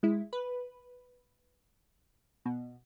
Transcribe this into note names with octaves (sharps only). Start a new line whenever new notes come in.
G#3 E4
B4
B2